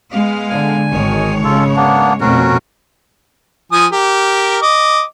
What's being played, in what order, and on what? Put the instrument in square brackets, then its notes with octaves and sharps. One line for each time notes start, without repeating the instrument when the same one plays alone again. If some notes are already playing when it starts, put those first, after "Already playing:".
[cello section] G#3 B3 F5
[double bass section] D3 [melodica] G#5
[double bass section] G#1 D#3 [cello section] G#3 C#5
[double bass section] C#3 [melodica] F4 A4
[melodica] A#3 B3 D4
[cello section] F2 A3 C4 [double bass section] B2 [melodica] C#4 F#4 A#4
[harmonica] F3 G#5 D#6
G4 A#4
D#5 D6